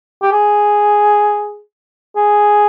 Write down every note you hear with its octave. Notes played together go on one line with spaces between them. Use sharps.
G4
G#4
G#4